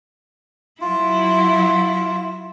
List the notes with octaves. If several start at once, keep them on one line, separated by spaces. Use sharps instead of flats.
F#3 E4 F4